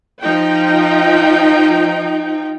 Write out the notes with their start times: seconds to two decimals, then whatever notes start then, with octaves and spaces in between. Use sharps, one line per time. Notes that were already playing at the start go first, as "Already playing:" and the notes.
0.20 F3 D#4 G5